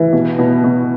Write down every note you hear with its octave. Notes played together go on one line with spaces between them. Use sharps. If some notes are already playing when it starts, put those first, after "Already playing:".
Already playing: E3
B2
B2
B2